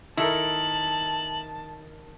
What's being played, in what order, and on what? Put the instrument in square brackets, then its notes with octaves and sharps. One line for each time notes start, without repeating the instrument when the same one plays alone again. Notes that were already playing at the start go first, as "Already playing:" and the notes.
[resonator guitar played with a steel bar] D#3 [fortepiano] E4 A4 A#4 [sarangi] A5 [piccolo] F#7